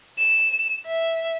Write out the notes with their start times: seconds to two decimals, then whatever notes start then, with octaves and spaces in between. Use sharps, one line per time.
0.17 E7
0.86 E5